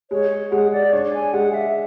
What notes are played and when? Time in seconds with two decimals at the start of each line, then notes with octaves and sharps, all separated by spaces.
0.11 G#3 C#5
0.52 G#3 F#5
0.72 D5
0.92 D4 C#5
1.14 G#5
1.33 G#3 F#5
1.54 E5